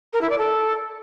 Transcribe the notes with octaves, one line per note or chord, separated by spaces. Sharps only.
A#4
E4
D5
A4